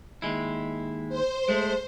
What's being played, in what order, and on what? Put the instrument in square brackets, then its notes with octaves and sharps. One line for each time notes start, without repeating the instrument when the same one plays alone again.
[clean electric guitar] D#2 G#3 E4
[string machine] C5
[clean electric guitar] G#3 A3